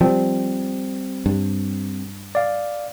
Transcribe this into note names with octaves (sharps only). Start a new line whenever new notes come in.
F3 G3 C4
G2
D5 F5